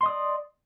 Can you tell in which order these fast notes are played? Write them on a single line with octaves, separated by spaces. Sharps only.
C6 D#5 D#6 D5